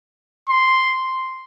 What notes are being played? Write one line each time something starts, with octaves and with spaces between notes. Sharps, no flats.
C6